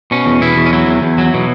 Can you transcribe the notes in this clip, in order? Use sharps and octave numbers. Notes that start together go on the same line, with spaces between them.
B2 C#4
E2
B2 E4
E2
C#4
F#3 E4
E2
E2
F#3
B2